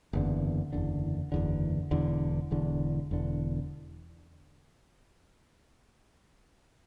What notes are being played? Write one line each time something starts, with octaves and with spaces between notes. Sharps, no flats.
F#1 E2 D3
F#1 E2 D3
F#1 E2 D3
E1 E2 D3
E1 E2 D3
E1 E2 D3